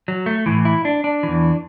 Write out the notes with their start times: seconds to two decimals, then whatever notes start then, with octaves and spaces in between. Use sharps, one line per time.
0.08 F#3
0.26 A3
0.46 A2 E3
0.65 E4
0.85 D4
1.04 D4
1.23 E2 E3